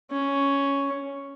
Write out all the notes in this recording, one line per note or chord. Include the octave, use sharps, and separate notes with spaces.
C#4